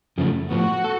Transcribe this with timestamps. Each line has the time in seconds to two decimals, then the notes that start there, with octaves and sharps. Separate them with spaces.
0.18 F#2 C#3 F3 A3
0.50 A2 F3 B3 F#4
0.84 A4